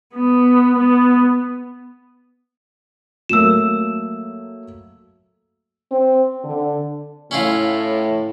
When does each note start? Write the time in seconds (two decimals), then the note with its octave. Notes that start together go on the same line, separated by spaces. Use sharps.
0.15 B3
0.77 B3
3.29 F#3 A3 A#3 E6 E7
5.91 C4
6.44 D3
7.31 A2 C#4 E4 F4